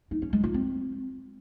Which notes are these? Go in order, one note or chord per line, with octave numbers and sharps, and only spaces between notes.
D#4
C#4
G#3
F4
C4